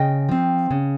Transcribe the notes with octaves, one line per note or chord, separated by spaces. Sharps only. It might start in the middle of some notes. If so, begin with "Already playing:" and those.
Already playing: C#3 D#5 G5
F3 C4
C#3